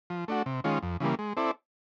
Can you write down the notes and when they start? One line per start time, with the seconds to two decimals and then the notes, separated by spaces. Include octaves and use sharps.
0.10 F3
0.28 A3 D4 F#4
0.46 C3
0.64 D#3 G#3 C#4 F4
0.82 F2
1.00 C#3 E3 G3 A#3
1.19 G#3
1.37 C4 E4 A4 D5